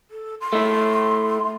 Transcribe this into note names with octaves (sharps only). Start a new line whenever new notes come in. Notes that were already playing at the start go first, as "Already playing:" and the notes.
A4
C6
A3 E4